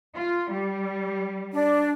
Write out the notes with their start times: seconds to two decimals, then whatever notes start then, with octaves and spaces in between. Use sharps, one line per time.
0.14 F4
0.52 G3
1.53 D4 D5